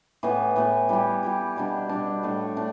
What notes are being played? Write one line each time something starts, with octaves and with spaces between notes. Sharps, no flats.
A2 E3 B3
A2 E3 B3
G3 E4 G4
G3 E4 G4
B2 G3 D4
B2 G3 D4
A2 A3 D4 A4
A2 D4